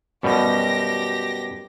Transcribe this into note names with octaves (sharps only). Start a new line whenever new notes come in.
F#2 B2 G3 G4 A#6